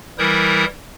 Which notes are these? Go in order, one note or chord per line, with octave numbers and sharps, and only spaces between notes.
E3 G3 E4 A#4 D#6 G6